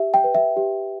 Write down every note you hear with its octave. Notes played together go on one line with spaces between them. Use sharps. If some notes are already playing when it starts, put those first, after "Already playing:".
Already playing: G4 E5
G5
B4
E5
G4